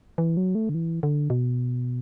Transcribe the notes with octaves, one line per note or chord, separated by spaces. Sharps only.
E3
F#3
A3
D3
E3
D3
B2